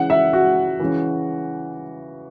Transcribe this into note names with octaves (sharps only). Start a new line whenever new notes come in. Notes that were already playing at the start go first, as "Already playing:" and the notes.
Already playing: C#3 E3 F#5
E5
F#4
C#3 E3